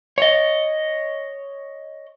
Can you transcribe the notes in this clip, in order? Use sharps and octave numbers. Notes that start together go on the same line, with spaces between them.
C#5 D#5